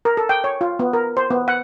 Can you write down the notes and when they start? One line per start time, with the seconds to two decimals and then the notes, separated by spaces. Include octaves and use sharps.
0.05 A#4
0.17 A4
0.29 G5
0.44 C#5
0.61 F4
0.79 B3
0.93 A#4
1.17 C5
1.30 B3
1.48 F#5